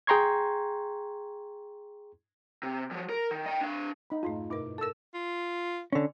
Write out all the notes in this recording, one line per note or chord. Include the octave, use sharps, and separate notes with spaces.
G#4 G5 A#5 C6 C#6 G#6
C3
F3 F#3
A#4
D#3
D#5 G5
D4 F5
D#4 B5
F2 G#2 A3 F4
G2 B2 D#4 E4 A#4 D6
A4 A#4 A5 E6
F4
D3 C#4